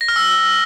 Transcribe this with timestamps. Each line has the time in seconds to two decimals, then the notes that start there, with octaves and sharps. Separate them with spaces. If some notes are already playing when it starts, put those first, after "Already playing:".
0.01 A#6
0.08 F6
0.16 E6